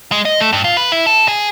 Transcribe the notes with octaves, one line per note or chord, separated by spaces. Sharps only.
G#3
D#5
A3
G2
F4
B4
E4
A4
G#4